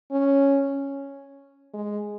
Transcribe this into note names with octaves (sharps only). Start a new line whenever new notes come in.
C#4
G#3